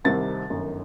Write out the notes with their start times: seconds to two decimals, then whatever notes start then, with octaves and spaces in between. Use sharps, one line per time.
0.04 C2 C3 D#3 G3 C4 A6
0.50 G1 F#2 D#3